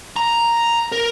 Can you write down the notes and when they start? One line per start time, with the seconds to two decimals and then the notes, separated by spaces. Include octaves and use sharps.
0.16 A#5
0.92 A#4